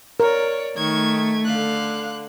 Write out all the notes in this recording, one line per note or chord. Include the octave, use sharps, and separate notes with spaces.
A#4 C#5 D5
D#3 A3 C#6 G#6
D3 F5 F#6